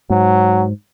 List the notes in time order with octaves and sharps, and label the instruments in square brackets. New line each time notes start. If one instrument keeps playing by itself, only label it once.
[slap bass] G#2 [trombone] F#3